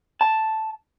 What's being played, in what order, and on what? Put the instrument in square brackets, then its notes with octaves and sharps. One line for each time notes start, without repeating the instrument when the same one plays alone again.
[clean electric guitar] A5